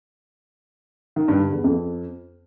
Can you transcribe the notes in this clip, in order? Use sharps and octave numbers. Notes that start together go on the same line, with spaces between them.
D#3
G2
D3
E2
F2